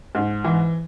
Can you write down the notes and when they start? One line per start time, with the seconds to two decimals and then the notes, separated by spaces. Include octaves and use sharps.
0.15 G#2
0.44 E3